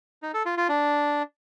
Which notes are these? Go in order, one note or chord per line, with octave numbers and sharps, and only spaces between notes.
D#4
A4
F4
F4
D4